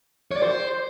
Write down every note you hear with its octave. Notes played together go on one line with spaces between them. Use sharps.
C#5
D5
C5